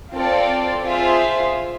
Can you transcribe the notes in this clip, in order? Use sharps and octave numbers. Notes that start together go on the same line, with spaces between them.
C4 F4 A4 D5
F4 G#4 C5 E5